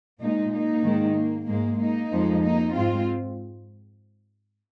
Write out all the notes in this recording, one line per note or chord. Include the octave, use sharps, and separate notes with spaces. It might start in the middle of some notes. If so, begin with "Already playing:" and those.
A#2 G#3 A#3 D#4
A#3 D#4
G#2 D#3 G#3
A#3
G#2 G#3 A#3
A#3 D#4
F2 F3 G#3
A#3 D#4
G#2 G#3 C4 F4